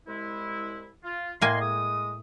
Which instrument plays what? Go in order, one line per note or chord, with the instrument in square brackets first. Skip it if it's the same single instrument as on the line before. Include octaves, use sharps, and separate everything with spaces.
[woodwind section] C2 G#3 E4
F4
[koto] A2 A#3 G#5 [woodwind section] D#5 C6
[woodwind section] G#3 D#6